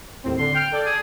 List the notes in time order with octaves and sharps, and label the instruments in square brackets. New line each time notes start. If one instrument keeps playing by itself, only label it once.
[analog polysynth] D#2 A2 C4
[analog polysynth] D3 [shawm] C6
[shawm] G5 [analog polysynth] F6
[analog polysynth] A4 D5
[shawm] G#4